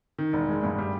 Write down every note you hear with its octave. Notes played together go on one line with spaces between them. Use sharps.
D#3
E1
G#3
G2
G3